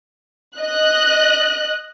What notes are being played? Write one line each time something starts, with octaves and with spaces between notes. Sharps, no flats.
D#5 F#6